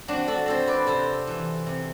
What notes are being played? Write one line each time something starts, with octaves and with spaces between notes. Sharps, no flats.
C4 D4 F#4
F#4 A4
C4 A4 C5
B4 D5
C3 A4 C5
E3
C3